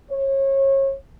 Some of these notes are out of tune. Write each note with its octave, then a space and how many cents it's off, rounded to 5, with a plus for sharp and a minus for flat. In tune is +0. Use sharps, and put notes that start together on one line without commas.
C#5 -30